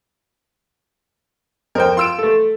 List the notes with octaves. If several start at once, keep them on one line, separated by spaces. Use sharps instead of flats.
F2 A#4 C5 G5
F4 C6 E6 D7
A3 A4